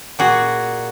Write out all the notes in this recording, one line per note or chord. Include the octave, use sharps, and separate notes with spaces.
A#2 F#4 G#4